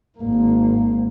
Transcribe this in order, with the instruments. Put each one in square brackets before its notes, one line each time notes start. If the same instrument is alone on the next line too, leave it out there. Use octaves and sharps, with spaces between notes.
[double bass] G#1 A#3